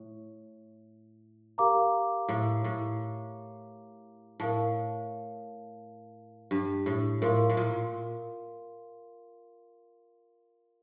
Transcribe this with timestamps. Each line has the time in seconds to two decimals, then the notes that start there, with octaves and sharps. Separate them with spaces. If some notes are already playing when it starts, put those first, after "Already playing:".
Already playing: A2
1.58 G4 A#4 F5 A#5 D6
2.29 A2
2.64 A2
4.40 A2 A#4 F5 A5
6.51 G2
6.86 A2
7.21 A2 F4 A#4 F5 C6
7.50 A2
7.57 A#2